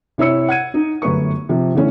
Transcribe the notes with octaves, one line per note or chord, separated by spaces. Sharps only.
C3 E4 C#5 E6 C#7
F#5 G#6 D#7
D#4
G1 F#2 A3 B4 C#6
C3 F3
D3 E3 A3 C#4